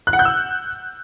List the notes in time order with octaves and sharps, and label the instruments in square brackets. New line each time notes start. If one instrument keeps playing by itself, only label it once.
[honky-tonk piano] F#6
F#5
G6
E6